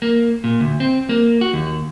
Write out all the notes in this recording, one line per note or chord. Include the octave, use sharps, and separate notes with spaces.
A#3
A#2
D2
C4
A#3
F#4
D#2